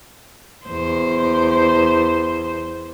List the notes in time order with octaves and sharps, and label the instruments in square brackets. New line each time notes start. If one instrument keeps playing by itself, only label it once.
[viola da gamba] E2 C5